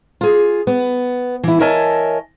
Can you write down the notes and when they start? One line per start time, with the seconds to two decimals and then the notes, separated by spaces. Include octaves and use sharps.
0.21 F4 G#4
0.67 B3
1.43 E3 E4
1.60 A#4 C#5 D#5 E5 G#5 A5